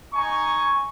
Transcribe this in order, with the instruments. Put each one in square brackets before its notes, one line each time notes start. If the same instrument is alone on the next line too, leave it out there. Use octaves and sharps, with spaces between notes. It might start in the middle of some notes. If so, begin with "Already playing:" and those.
[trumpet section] D#4 G#5 C#6